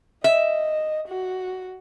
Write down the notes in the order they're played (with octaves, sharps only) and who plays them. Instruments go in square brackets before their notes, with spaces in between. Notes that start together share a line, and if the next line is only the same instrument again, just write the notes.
[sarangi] D#5 [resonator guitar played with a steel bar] E5
[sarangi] F#4